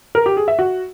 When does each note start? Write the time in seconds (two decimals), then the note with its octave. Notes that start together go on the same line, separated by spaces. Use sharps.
0.15 A#4
0.26 G4
0.37 G#4
0.48 E5
0.59 F#4